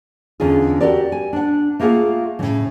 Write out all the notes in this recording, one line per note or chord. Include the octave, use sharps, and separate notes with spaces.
E2 D3 C#4 D#4 F4 G#4
F#4 G4 A4 A#4 D5
G#5
D4 F#5
A3 A#3 F4 G#4 F#5
A2 C#3 E3